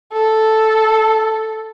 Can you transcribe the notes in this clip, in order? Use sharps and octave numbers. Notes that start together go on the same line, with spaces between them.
A4